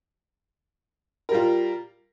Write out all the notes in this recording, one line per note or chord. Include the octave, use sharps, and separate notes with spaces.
G3 F4 A#4